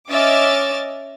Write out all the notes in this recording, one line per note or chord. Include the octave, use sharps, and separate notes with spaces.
C#4 D#5 E5 D6 F6 A6